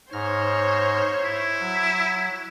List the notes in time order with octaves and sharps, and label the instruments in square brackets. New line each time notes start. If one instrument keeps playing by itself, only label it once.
[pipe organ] G#2 F6 A#6 [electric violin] C5 C#5
[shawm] E4
[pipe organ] F#3